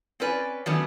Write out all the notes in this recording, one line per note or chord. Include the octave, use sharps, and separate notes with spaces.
C4 C#4 B4 D5 G#5
D#3 F#3 A3 B3 C#4 D4